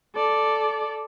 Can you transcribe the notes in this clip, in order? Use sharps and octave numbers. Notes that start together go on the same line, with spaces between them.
A4 D5